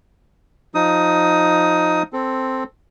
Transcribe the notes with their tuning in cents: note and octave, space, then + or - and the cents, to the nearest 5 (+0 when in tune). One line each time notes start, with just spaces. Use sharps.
F3 +10 D#4 +0 D#6 +15
C4 +0 A4 +0